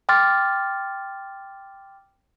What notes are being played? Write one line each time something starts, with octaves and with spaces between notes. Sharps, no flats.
G5 C6 D6 F6 A6